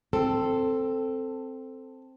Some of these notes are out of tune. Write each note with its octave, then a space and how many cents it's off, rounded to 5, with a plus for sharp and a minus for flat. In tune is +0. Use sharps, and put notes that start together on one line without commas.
C4 +0 A4 +10